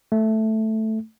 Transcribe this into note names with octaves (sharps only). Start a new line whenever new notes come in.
A3